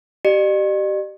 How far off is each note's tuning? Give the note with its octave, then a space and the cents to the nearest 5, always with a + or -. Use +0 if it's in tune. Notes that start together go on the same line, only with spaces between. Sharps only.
G4 -25 D5 +45